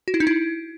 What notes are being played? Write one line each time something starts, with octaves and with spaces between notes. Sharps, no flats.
F#4
E4
D#4
E4